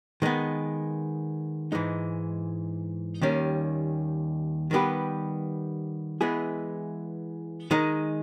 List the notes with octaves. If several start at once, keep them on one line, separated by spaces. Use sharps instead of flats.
D#3 G#3 B3
G#2 E3 G#3 D#4
D#2 D#3 G3 C#4
D#3 G3 B3 G4 B4
E3 G#3 B3 E4 G#4
D#3 G#3 D#4